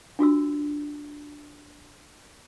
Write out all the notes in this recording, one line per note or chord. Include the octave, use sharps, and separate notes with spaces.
D4 F4 F#4 E6